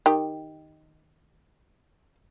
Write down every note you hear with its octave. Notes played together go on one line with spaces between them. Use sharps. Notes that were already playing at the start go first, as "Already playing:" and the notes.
D#3 G4